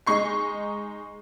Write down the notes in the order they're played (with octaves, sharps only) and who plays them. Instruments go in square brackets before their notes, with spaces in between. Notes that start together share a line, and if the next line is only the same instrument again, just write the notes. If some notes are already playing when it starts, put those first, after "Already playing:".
[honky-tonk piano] G#3 D#4 C#6 C7